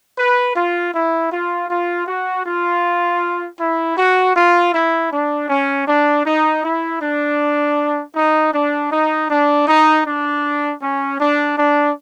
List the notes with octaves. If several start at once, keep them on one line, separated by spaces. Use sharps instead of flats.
B4
F4
E4
F4
F4
F#4
F4
E4
F#4
F4
E4
D4
C#4
D4
D#4
E4
D4
D#4
D4
D#4
D4
D#4
D4
C#4
D4
D4